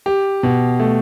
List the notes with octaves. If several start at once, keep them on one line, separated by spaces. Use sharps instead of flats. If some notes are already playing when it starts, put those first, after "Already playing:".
G4
B2
A3